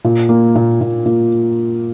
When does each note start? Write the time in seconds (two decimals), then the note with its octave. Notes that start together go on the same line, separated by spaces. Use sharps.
0.05 A#2
0.29 A#3
0.56 A#2
0.81 A#2
1.06 A#2